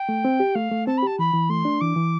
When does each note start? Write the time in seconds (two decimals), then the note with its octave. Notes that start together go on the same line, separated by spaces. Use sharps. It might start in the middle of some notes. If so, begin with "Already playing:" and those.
Already playing: G5
0.09 A3
0.25 C4
0.40 G4
0.55 A3 F5
0.72 A3
0.87 C4 A5
0.97 B5
1.02 G4 A5
1.19 E3 B5
1.34 E3
1.50 A3 C6
1.65 D4
1.81 E3 D6
1.96 E3